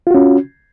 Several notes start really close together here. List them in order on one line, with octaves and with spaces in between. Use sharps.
F4 F#4 C#4